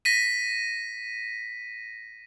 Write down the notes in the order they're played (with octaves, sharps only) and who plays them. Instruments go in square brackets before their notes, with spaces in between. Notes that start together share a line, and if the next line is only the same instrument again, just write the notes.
[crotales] A#6 B6 D#7